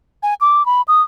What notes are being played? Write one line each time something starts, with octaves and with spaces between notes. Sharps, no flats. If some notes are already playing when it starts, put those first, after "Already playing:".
G#5
D6
B5
D#6